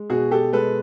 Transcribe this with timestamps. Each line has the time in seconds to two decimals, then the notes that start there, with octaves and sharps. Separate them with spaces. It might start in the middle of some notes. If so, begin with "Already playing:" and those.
Already playing: G#3
0.10 B2 F#4 G#4
0.31 G4 A4
0.53 G#3 A4 B4